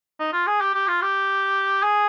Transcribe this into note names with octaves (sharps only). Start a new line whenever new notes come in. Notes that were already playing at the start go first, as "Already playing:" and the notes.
D#4
F4
G#4
G4
G4
F4
G4
G#4